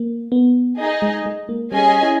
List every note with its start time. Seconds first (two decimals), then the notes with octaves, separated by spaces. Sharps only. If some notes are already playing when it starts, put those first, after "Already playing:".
Already playing: A#3
0.32 B3
0.79 D#4 G#4 D#5
1.02 G#3
1.26 G#3
1.49 A#3
1.72 G3 C#4 G#4 D#5 G#5
2.03 E4